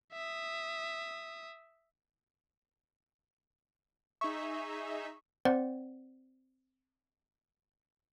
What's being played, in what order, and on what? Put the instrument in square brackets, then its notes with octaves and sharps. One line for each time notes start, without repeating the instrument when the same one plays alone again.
[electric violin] E5 D#6
[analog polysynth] D#4 G#4 E5 [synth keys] C#6
[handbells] C4 C5 D5 F#5